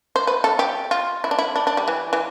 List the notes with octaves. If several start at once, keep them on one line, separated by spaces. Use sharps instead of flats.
C5
B4
A4
G4
F4
E4
D4
E4
D4
D4
G3
E3
E3